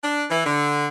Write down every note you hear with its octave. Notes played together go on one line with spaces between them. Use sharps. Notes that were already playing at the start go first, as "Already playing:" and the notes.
D4
E3
D3